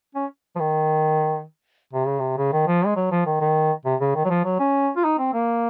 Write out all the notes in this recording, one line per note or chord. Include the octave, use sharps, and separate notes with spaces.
C#4
F3
D#3
C3
C#3
C3
C#3
D#3
F3
G#3
F#3
F3
D#3
D#3
C3
C#3
D#3
F#3
F3
F#3
C#4
F4
D#4
C4
A#3